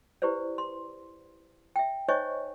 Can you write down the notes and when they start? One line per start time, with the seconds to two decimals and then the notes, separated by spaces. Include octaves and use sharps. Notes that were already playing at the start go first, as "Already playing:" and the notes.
0.22 E4 G4 B4 C5 D5
0.58 C6
1.76 E5 G5
2.08 D#4 C5 C#5 D#5 G#5 C#6